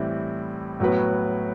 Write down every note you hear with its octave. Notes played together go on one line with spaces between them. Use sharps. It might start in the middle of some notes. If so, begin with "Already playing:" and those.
Already playing: A2 E3 G3 C4 E4
A2 F#3 B3 F#4 B4